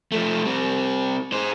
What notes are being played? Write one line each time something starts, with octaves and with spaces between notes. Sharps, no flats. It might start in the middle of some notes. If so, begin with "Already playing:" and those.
F3 A3
G3 C4
G#4 C5